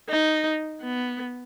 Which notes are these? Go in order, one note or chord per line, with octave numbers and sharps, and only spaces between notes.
D#4
B3